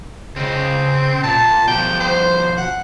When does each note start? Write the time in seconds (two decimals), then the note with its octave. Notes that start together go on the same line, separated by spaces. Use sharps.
0.36 C#3 C4 D#5
1.23 A#2 A5
1.67 B2 F3 G5
2.00 C5
2.57 F#5